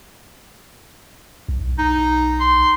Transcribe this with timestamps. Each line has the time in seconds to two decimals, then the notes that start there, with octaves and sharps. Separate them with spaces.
1.48 B1
1.78 D#4
2.40 C6